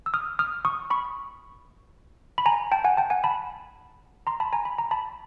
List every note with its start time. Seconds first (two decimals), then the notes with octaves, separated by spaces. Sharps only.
0.06 E6
0.14 D#6 F6
0.39 D#6 F6
0.65 C#6 D#6
0.90 B5 C#6
2.38 B5
2.46 G#5 A#5
2.72 G5 A5
2.84 F#5 G#5
2.97 G5 A5
3.10 F#5 G#5
3.24 A5 B5
4.27 A#5 C6
4.40 A5 B5
4.53 G#5 A#5
4.65 B5
4.78 A#5
4.91 A5 B5